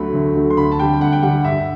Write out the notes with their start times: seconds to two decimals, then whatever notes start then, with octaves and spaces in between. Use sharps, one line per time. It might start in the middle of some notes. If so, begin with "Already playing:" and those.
Already playing: D2 D3 F#3 A3 B5
0.13 D2
0.35 D3 F#3 A3
0.50 C6
0.57 D2 B5
0.71 A5
0.79 D3 G3 G5
1.01 D2 F#5
1.13 G5
1.23 D3 G3 F#5
1.45 G2 E5